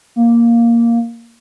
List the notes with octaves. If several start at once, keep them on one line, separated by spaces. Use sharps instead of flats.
A#3